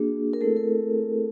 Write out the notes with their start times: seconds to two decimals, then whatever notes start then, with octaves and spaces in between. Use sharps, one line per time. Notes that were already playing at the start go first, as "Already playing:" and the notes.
Already playing: A#3 D4 F#4 G#4
0.33 A#4
0.41 A3 C4 E4 A4
0.56 A#4